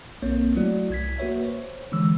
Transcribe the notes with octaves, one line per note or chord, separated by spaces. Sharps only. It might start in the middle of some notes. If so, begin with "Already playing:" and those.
B1 A#3 C4 C#5
F#3 A3 E4 F#4 D5
C2 G#6 B6
A#3 F#4 B4 C#5 E5
C5 C#5
D3 E3 G#3 E6